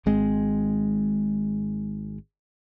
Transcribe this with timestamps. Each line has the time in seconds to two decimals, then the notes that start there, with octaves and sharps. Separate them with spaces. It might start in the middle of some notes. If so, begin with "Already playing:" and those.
0.06 G#1 G#2 G#3 C4